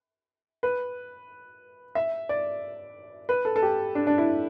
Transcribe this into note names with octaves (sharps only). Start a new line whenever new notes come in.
B4
E5
D5
B4
A4
A4
G4
D4
D4
E4